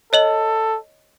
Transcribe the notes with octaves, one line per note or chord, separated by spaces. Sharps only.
A4 C#5 D#5 F#7